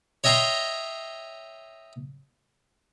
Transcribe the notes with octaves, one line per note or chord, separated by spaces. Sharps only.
C#5 D#5 E5 G5 A#5 C6